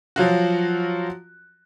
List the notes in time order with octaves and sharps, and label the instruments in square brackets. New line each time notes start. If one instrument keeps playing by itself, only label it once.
[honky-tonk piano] F3 F#3 F4 F#4